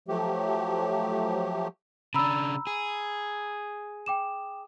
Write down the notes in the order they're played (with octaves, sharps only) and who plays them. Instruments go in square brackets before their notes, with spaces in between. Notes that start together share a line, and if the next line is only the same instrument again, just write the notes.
[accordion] F3 F#3 A3 G4
[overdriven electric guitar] C#3 D4 [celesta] A#5 B5 E6
[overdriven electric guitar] G#4
[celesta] G5 D6 E7